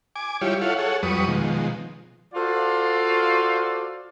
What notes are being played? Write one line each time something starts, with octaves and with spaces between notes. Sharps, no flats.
G#5 D6
G3 E4 F4 G4 C#5
E4 F4 A4 C#5 F5 F#5
G#4 A4 C#5 F#5
F2 F#3 G3 B4 C#6 D#6
B2 D#3 F3 G#3
F4 F#4 A4 C5 D5 F5